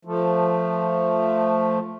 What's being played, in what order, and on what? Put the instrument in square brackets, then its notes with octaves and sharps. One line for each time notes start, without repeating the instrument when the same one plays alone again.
[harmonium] F3 A3